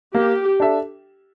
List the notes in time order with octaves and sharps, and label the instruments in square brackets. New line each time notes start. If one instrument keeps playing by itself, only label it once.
[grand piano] A#3 [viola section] G4
[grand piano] D4 A4 E5